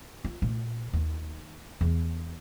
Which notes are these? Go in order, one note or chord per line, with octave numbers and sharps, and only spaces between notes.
F4
A#2 A3
D#2
E2